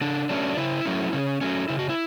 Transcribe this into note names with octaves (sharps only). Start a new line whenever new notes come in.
C#3 D4
F#3 A3 C#4 D4
C#3 E4
F#3 A3 C#4
C#3 C#4
F#3 A3 C#4
C#3 E4
F#4
E4